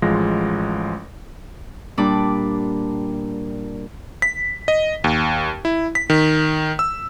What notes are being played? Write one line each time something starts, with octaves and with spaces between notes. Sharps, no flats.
A1 F3 G#3 F4 A#6
A#2 G3 D4 B5 D6
B6
D#5
D#2
E4
B6
D#3
E6